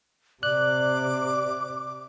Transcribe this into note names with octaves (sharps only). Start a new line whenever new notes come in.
C3 D5 D6 F#6